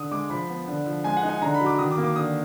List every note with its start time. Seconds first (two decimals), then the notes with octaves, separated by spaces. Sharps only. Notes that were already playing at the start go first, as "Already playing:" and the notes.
Already playing: D3 D#6
0.11 G#3 D6
0.30 F3 B5
0.49 B3
0.68 D3
0.86 F3
1.04 G#3 G#5
1.17 F#5
1.23 D#4
1.29 G#5
1.41 D3 A#5
1.54 B5
1.60 F#3
1.66 D6
1.79 D#3 D#6
1.91 D6
1.97 A#3
2.04 D6
2.16 D3 D#6